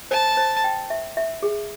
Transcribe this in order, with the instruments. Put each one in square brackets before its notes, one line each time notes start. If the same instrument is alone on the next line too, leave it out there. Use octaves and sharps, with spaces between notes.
[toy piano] C5 [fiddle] A5
[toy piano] C5
G5
E5
E5
G#4